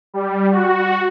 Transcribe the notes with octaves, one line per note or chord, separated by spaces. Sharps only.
G3
F#4